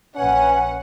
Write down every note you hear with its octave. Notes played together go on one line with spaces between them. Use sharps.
A#1 C#4 B4 F#5 G#5